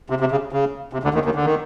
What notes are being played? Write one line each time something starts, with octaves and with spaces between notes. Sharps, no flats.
C3
C3
C#3
C#3
C3
D2 D3
D#2 D#3
D#2 D#3
D3
D#3